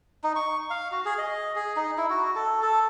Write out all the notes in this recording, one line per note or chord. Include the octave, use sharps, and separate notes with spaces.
D#4
C#6
F5
F#4
G#4
D#5
G#4
D#4
E4
F#4
A4
A4